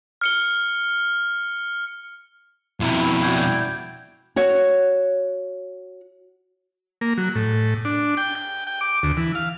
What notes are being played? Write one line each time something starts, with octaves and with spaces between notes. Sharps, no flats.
F6 C#7 G7
F2 B2 E4 A#5 C6
E4 F#4 D5 G5 G6 G#6
F#4 C#5 F#5
A#3
F#3
A2
D4
G5
G5
G5
D6
D2
E3
F5